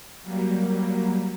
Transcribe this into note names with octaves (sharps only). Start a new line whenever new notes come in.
F#3 G3 A#3